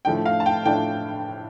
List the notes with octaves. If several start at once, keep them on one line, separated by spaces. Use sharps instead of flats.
A2 F3 A3 D4 G5
F5
A5
G5
A2 F3 A3 D4 G5